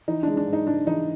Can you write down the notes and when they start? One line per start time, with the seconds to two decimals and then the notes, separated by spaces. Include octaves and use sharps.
0.08 E3 D#4
0.23 G#3 D4
0.37 D4
0.47 G#2
0.53 D#4
0.67 G#2 D4
0.86 E3 D#4